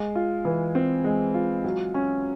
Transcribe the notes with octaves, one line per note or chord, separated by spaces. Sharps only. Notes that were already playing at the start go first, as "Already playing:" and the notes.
Already playing: G#3
F4
E3
C4
G#3
F4
F#3
C#4